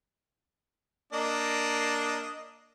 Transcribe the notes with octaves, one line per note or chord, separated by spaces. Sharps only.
A#3 D4 D#5